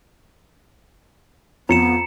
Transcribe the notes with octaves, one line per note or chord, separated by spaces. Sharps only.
F2 B3 A#5 C#7 E7